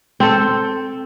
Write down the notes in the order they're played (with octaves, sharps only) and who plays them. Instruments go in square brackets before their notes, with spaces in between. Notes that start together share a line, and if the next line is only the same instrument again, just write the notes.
[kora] C4 A4